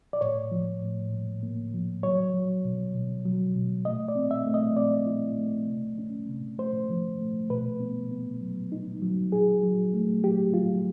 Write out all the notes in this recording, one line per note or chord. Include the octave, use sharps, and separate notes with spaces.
D5
A2 C#5
F3
A2
A2
A#3
F3
F#3 C#5
F#3
B2
B2
F#3
B2
A3 D#5
D5
C4
E5
A3
D#5
C4 D5
E4
A3
C3
C#4
C3
A3 C5
F3
A3
B2 B4
B3
B3
F#3
D#4
F#3
F#3 G#4
F#3
A3
F#3 G4
F#3 F4